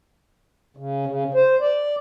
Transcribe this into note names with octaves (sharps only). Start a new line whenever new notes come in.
C#3
C#3
C5
D5